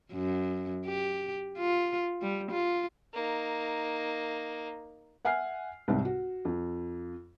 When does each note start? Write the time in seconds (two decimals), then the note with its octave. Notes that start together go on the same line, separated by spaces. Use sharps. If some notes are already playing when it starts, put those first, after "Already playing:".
0.13 F#2
0.86 G4
1.58 F4
2.22 G3
2.51 F4
3.14 A#3 D#4
5.25 E5 F#5 G#5 F6 C7
5.88 C2 G#2 C4
6.05 F#4
6.45 F2